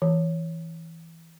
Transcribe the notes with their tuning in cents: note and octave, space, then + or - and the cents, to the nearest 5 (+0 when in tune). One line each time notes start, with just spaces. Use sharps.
E3 -5